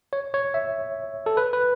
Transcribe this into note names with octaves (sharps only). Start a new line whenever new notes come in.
C#5
C#5
E5
A4
B4
B4